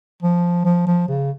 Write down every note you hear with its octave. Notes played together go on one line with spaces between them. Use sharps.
F3
F3
F3
C#3